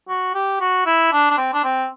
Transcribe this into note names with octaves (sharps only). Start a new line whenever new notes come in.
F#4
G4
F#4
E4
D4
D4
C4
D4
C4